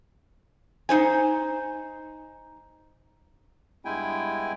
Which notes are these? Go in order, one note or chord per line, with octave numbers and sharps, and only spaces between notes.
D#4 C5 G#5
G2 G#3 B3 E4 G5 G#5